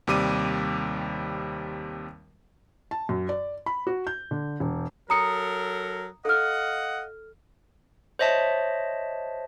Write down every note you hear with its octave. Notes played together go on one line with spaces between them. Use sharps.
D#2 C3 G3 D6 D#7
A5
F#2
D5
B5
F#4
G6
D3
E1
F#3 A4 A#4 A#5 D#6 C#7
A4 D#5 F5 F#5 F6
C5 C#5 D#5 E5 A5